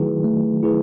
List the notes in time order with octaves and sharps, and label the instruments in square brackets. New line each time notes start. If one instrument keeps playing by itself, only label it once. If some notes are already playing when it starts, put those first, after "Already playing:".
Already playing: [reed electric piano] D#3 F#3 [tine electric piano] A3 E4 G#4 B4
[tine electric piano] A3
E4 G#4 B4